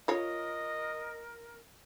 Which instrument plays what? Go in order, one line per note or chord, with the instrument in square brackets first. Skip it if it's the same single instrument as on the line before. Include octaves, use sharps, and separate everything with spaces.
[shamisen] F4 C#5 [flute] A#4 [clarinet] D#5